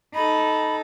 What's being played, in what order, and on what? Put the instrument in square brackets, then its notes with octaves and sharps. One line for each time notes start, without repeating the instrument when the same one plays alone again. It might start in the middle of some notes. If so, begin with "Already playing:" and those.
[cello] D#4 A4 [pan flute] B5